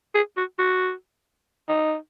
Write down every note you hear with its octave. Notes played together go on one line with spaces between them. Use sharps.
G#4
F#4
F#4
D#4